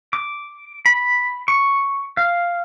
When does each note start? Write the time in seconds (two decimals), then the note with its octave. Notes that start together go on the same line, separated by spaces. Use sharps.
0.13 D6
0.86 B5
1.48 C#6
2.17 F5